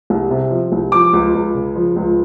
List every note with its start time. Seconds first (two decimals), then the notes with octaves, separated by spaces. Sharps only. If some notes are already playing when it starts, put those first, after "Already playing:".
0.10 C2
0.30 C3
0.51 F3
0.72 C2
0.92 F3 D6
1.13 C#2
1.34 C#2
1.55 C#3
1.75 F3
1.96 C#2